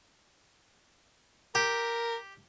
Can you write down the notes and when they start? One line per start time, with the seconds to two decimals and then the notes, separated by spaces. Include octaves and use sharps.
1.55 G4 A#4